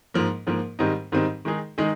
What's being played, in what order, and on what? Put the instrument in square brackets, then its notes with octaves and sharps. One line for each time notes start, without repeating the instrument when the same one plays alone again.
[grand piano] G#2 F3 A#3
G#2 F3 A#3
G#2 D#3 G3 C4 D#4
G#2 D#3 G3 C4 D#4
D#3 G#3 D#4 G#4
D#3 G#3 D#4 G#4